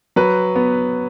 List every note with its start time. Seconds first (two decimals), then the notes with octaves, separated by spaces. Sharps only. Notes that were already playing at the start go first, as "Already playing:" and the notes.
0.16 F#3 B4
0.56 B3